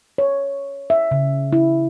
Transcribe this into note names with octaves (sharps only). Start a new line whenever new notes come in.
C#5
E5
C#3
E4